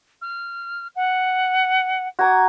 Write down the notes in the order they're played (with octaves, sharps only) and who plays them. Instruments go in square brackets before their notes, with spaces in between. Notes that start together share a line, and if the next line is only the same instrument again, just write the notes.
[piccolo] F6
F#5
[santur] F#4 A#5 D6 [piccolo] G#6